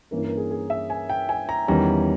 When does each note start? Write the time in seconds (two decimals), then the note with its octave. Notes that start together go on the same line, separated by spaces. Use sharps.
0.11 G2 E3 A#3 C#4 A#4
0.24 A#4
0.37 G#4
0.51 G#4
0.70 E5
0.90 G#5
1.10 G5
1.29 G#5
1.49 A#5
1.68 E2 D#3 G3 C#4 A#5